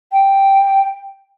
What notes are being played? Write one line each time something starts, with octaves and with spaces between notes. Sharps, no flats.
G5